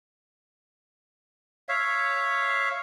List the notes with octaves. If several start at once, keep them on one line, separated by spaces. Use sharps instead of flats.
C#5 E5 F5